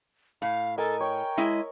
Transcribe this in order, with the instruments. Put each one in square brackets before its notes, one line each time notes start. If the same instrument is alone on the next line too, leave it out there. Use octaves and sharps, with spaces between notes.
[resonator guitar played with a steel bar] A2 [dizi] F5
[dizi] A4 [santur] A#4 D#5 G#5
[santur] C#5 [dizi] G5
[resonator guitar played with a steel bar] G#3 E4 D#5